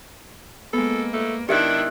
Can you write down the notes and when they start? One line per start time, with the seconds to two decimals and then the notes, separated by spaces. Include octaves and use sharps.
0.73 G#3 A#3 B3 A4
1.13 A3
1.49 D#3 D4 E4 G4 E5 F#6